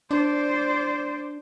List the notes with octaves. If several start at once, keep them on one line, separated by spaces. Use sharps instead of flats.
D4 C5 D5